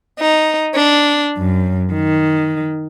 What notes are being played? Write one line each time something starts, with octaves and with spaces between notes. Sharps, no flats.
D#4
D4
F#2
D#3